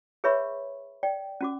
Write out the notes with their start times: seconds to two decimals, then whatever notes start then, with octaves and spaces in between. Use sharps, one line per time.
0.24 G#4 B4 C#5 E5 B5 C#6
1.03 D5 G5
1.41 C#4 F#4 D6